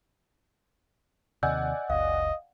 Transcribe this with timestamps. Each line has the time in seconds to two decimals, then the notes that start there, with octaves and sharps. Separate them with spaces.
1.43 D#2 C3 D5 D#5 F#5 G#5 E6 G6
1.90 F#1 C#2 D#5 F5